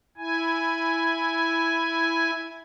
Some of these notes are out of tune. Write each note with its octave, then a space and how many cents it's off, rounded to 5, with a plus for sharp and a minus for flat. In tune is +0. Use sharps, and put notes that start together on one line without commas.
E4 +0 G#5 +0